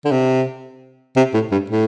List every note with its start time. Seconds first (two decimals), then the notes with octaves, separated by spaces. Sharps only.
0.05 D3
0.12 C3
1.17 C3
1.34 A2
1.52 G2
1.70 A2